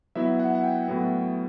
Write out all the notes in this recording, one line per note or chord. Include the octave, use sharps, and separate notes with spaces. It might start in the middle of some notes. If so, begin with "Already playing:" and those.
F#3 B3 E4 E5
F#5
F#5
G5
A2 F#3 B3